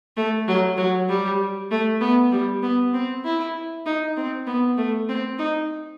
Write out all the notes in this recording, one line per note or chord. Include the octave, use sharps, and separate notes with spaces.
A3
F#3
F#3
G3
A3
B3
G3
B3
C4
E4
D#4
C4
B3
A3
C4
D#4